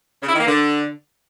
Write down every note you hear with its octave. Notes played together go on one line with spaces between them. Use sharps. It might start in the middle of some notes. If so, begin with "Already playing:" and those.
C#3
E4
D#3
A#3
D3